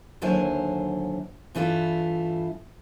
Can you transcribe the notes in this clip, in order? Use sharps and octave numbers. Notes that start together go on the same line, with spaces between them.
D#2 D3 F#3 E4 C5 G#5
G2 E3 A3 E4 F4